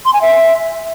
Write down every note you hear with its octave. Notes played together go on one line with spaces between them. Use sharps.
C6
G#5
E5